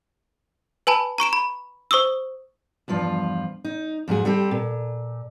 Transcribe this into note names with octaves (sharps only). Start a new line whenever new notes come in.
B4 G#5 A5 B5
A#5 C#6 D7 E7
B5
C5 C#6 D#6 E6
E2 G2 F3 F4
D#4
F2 G#2 F#3 G#4
G3 C4 G4 A4
A#2